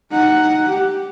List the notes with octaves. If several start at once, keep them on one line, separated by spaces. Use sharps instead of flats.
D#4 F#5
G4